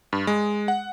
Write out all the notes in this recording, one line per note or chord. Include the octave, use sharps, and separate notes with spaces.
G2
G#3
F#5